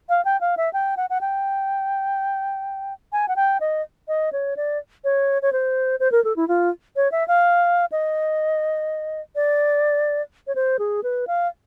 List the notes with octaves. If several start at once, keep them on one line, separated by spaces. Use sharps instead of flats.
F5
G5
F5
E5
G5
F#5
F#5
G5
G#5
F#5
G5
D#5
D#5
C#5
D5
C#5
C#5
C5
C5
A#4
A4
E4
F4
C#5
E5
F5
D#5
D5
C#5
C5
G#4
B4
F5